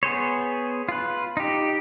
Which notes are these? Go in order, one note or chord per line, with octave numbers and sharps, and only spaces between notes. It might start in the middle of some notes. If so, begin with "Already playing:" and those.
B3 G#4 C5 C#5
F4 B4
D#4 G4